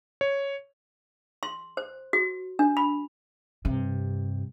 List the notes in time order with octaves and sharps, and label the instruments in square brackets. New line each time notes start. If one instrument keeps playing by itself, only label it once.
[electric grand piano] C#5
[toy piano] C6
C5
F#4
D4
B5
[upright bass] G2 C3